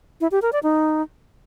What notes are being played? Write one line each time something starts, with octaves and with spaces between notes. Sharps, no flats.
E4
G4
A#4
D5
D#4